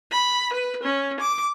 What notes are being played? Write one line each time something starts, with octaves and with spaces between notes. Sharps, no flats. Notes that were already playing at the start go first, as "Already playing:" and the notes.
B5
B4
C#4
D6